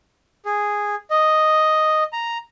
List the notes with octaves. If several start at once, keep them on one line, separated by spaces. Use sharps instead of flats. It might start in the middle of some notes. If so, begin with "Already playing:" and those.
G#4
D#5
A#5